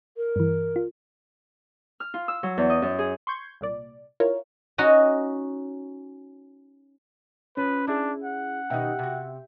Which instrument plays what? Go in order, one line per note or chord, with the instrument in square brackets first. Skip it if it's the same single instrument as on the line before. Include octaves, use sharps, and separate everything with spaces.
[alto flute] A#4
[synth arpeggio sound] G2 E3
F4
[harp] F6
F4
E6
F#3
E2
D#5
F#2
G#4
[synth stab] C6 C#6 G6 G#6
C2 A#2 D5
E4 F4 A#4 C#5
[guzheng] C#4 D#4 F#4
[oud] F3 [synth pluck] C#4 [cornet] B4
[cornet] D4 [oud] E4 G#4
[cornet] F#5
[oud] B2 D#3 D#4 [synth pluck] G4 E5 G5
[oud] C3 F#4